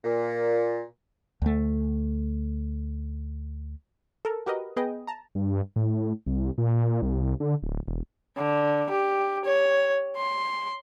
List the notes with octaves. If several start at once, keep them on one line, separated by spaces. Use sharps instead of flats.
A#2
D2 A3
A4 A#4
F#4 G4 A#4 B4 D#5
B3 G#4 B4 D#5 G5
A5 A#5
G2
A2
C2
A#2
C2
D3
D1
E1
D3
G4
C#5
C6